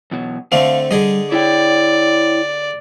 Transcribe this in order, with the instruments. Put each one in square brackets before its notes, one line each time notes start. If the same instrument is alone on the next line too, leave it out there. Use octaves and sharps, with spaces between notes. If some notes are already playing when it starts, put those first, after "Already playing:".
[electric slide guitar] E2 B2 F#3
[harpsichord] D3 A3 C4 [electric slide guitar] F5
[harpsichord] D3 G#4 D#5 [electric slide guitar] G3
[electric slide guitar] E4 C#5 G5 [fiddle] D5